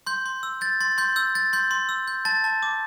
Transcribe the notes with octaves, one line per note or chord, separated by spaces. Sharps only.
C6 G6
C6
E6
G6 A6
C6 A6
C6 G6
E6 G6
G6 A6
C6 G6
C6
E6
G6
A5 A6
A5
D6